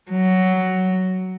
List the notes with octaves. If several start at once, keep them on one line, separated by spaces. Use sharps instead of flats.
F#3